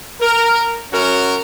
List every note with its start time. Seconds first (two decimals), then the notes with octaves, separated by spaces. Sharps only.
0.21 A#4
0.92 F#2 C#4 F#4 A#4